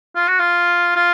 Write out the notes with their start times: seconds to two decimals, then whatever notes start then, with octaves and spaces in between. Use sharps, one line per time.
0.16 F4
0.28 F#4
0.39 F4
0.96 F4